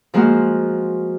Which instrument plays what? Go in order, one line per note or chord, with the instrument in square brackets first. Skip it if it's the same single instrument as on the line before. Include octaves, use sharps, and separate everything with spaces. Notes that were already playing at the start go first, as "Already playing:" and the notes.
[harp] F3 G#3 A#3 F4 F#4